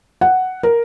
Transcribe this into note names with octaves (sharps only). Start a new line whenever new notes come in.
F#5
A#4